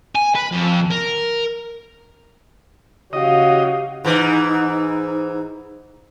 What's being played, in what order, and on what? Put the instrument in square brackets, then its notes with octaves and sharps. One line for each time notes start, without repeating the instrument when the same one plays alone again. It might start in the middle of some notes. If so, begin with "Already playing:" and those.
[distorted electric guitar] G#5
B4
F2
A#4
[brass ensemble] C#3 F#4 C#5 [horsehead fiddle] G4 F5 [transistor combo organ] D#5
[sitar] G#2 E3 [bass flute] D#4